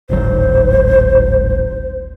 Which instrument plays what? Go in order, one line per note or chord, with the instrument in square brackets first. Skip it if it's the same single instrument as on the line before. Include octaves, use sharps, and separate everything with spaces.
[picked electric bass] D1 G#1 F#3 [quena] C5